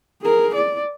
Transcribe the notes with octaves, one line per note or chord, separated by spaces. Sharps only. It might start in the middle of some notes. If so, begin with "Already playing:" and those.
G#4 A#4
D5